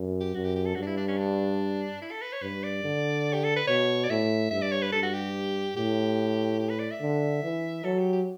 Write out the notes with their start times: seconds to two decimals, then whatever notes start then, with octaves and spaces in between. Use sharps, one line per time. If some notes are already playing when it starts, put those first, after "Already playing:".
Already playing: F#2
0.21 G4
0.34 F#2 F#4
0.45 G4
0.56 G4
0.66 A4
0.76 G2 F#4
0.82 D4
0.87 E4
0.97 D4
1.08 C#4
1.18 D4
2.02 E4
2.11 A4
2.22 B4
2.33 C#5
2.42 G2 B4
2.64 D5
2.84 D3
3.33 G4
3.44 A4
3.56 B4
3.67 B2 C#5
4.04 D5
4.10 A2 E5
4.51 G2 E5
4.62 D5
4.72 C#5
4.83 B4
4.92 G2 A4
5.03 F#4
5.14 G4
5.76 A2 G4
6.60 G4
6.70 B4
6.80 D5
6.91 E5
7.01 D3
7.43 E3
7.84 F#3 A4
7.99 G4
8.13 G4